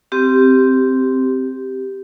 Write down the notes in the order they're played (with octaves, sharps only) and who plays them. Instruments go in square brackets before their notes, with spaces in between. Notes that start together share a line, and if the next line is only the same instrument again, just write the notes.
[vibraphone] C4 G4